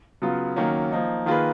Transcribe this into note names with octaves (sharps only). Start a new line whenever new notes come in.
C#3 F#3 B3 F4
D#3 F#3 A#3 C#4
F3 A#3 D#4
D#3 A#3 F4 G#4 B4